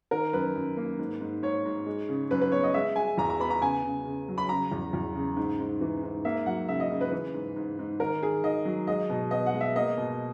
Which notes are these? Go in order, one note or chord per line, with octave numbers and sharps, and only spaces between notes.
D#3 A#4
F#2 B4
F#2
A#3
G#2
G#2
G#2 C#5
G#2
G#3
C#3
F#2 B4
B4
B3 C#5
D#5
G#3 E5
G#3 G#5
E2 A#5
A#5
B3 B5
A#5
C#3 G#5
C#3
C#3
F#3
B5
C#3 A#5
E2
E2
C#3
G#2
G#2
E3
G#2
A#3 E5
F#3 F#5
C#3 E5
D#5
C#3
B4
E3
G#2
G#2
G#2
D#3 A#4
D#3 G#4
D#3 D#5
F#3
G#3 D#5
B2
B3 D#5
F#5
G#3
E5
A#3 D#5
B2